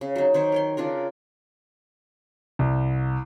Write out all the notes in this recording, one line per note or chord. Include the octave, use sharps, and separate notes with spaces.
C#3
F#3 D#4
D#3 C5 C#5
A#4 C#5 C6
C#3 D4 F4 A#4
C2